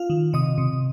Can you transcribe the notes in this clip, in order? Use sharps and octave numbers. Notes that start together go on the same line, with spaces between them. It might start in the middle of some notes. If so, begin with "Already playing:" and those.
Already playing: F4 F5
D#3
C3 D#5 D#6
C3